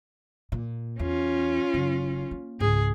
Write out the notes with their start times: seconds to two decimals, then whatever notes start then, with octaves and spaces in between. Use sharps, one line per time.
0.52 A#2
0.99 E2 C#4 F4
1.74 F#1
2.31 A#3
2.60 C#2 G#2 G#4